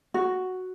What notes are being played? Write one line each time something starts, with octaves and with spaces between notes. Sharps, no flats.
F#4